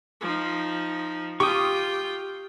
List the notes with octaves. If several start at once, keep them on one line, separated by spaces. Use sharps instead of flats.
F3 D#4
F4 G4 G5 C#6 D#6